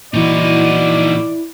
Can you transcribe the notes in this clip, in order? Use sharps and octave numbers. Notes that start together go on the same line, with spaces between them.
A#2 E3 D#4 E4 F#4 D5